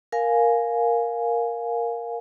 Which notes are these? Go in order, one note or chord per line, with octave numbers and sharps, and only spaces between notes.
A#4 F5 G#5